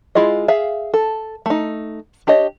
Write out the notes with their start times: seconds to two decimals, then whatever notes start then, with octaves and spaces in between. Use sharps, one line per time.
0.15 G#3 E4 F4 G#4 D#5
0.48 G#4 E5 F5
0.94 A4
1.46 A3 D#4
2.27 D4 G4 C#5 D#5